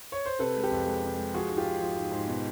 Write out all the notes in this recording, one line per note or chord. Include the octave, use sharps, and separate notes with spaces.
C#5
C5
C3 A4 B4
G#3
G4 A4
F2
G#3
C3
G#3
F3 F#4 G#4
G#2
F4 G4
G#2
F3
G#2
G#2
B2